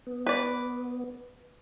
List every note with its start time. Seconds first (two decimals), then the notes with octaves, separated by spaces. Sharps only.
0.07 B3
0.27 B4 D5